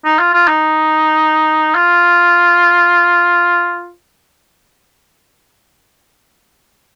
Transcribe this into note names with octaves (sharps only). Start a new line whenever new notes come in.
D#4
F4
F4
D#4
F4